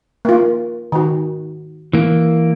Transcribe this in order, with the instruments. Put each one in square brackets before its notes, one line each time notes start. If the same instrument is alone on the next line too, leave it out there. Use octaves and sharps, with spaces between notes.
[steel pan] A#3 F4
D#3 F#4
[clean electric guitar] E3 A#3